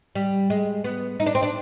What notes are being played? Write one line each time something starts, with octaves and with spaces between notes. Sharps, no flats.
G3
G#3
B3
D#4
D4
C4
D4